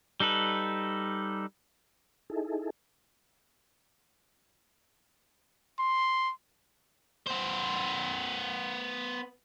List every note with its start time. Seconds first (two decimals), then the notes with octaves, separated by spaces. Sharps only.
0.20 G3 D#4 A4 B4
2.30 D#4 E4 G#4 A4
5.79 C6
7.27 B3 C5